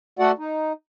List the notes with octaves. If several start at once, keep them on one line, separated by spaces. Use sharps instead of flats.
A3 F#4 A4 D5 F#5
D#4